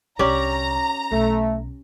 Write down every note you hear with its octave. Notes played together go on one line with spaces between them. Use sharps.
C2 D3 C#4 G4 D5 A#5
B1 A3